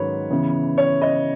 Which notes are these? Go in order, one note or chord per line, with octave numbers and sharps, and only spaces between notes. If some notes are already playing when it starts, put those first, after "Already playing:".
Already playing: G#2 D#3 F#3 C#4 B4 C#5
C#3 E3 B3
C#5
D#5